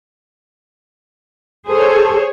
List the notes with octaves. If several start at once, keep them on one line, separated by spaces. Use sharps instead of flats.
G#4 A4 C5 C#5